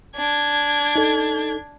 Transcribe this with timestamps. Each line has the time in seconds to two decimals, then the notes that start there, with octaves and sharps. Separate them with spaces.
0.14 D4 G#6
0.96 D#4 A4